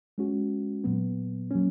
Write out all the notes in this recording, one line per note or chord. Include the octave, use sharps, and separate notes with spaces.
G#3 C#4 F#4
A#2 F#3 B3
F#3 A#3 C#4